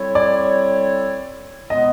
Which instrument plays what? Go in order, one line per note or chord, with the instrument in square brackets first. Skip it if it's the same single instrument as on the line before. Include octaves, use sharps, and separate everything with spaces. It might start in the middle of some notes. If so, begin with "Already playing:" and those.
Already playing: [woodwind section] G3 C4 E4 A4 C#5
[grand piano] D5
[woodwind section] B2 G#3 B3 [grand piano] D#5